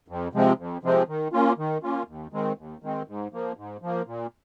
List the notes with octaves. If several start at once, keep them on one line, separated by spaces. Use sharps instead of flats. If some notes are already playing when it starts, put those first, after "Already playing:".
F2
C3 F3 G#3 C4
F2
C3 F3 G#3 C4
D#3
A#3 C#4 F4
D#3
A#3 C#4 F4
D#2
D#3 G#3 C4
D#2
D#3 G#3 C4
G#2
F3 A#3
G#2
F3 A#3
A#2